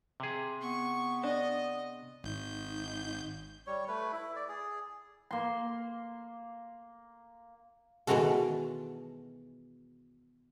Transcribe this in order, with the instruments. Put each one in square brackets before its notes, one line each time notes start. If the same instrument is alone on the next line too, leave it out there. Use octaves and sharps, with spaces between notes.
[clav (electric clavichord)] C3 G#4
[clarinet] B3 [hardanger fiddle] C#6
[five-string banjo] D4 [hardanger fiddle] D#5
[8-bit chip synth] G#1 G6 [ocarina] D#4
[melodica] G3 C#5
A3 B4
E4
D5
G#4
[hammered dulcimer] A#3 C6
[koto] B2 D#3 E3 G#3 F#4 A4